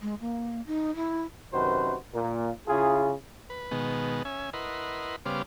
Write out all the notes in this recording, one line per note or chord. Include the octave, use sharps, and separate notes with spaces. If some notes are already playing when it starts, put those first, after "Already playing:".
G#3
A#3
D#4
E4
F#2 C3 D#3 F#4 B4 C5
A#2 A#3
C#3 E4 F4 G#4
B4
B2 D#3 G#3 B3
C#4 E5 G#5
E4 A#4 B4 D#5 F#5 C6
C#3 G3 B3 C5 F5 D6